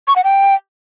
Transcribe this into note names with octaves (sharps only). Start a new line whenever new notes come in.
C#6
F#5
G5